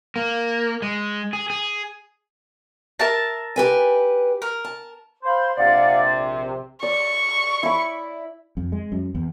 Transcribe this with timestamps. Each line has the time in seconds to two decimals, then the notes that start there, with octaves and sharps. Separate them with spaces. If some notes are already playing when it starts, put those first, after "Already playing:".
0.16 A#3
0.82 G#3
1.33 G#4
1.50 G#4
3.00 A#4 E5 A5
3.56 G4 B4 G#5
4.42 A#4
4.64 A5
5.23 C5 F5 B5 C6
5.57 A#1 C3 D5 F5 F#5
6.05 C5
6.83 D5 C#6
7.63 E4 B5
8.57 F2
8.72 G#3
8.92 F#2
9.15 E2